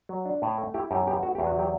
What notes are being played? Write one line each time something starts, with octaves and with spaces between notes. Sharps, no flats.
F#3
D4
A2
A3
E4 G4
F#2 G4
B3 G4
A3 F#4
G4
E2
F#4
F#3 G4